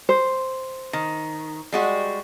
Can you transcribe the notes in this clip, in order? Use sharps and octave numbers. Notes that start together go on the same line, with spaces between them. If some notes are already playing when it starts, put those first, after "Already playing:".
C5
D#3
G3 G#3 F#4